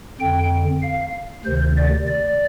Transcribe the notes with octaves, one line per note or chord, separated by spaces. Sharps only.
F2 D3 G5
F5
D2 C3 D#3 C5
D5
D5